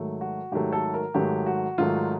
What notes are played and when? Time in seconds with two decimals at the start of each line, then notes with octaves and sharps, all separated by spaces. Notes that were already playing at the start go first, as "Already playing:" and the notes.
Already playing: G#2 D#3 F#3 A3
0.21 F#4
0.52 G#2 D#3 F#3 A3 G4
0.73 A4
0.94 A#4
1.14 G#2 D#3 F#3 A3 G4
1.46 F#4
1.78 G#2 D#3 F#3 A3 F4